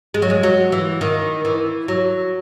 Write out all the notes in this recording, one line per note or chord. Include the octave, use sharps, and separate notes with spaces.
G#3
F#3
G#3
F#3
E3
D#3
E3
F#3